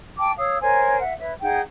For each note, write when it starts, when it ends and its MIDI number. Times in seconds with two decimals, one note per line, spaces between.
0.18 0.32 79
0.18 0.32 81
0.18 0.32 86
0.38 0.58 73
0.38 0.58 77
0.38 0.58 87
0.38 0.58 88
0.61 1.01 70
0.61 1.01 72
0.61 1.01 73
0.61 1.01 80
1.01 1.13 76
1.01 1.13 78
1.18 1.32 71
1.18 1.32 73
1.18 1.32 76
1.41 1.60 63
1.41 1.60 68
1.41 1.60 78
1.41 1.60 79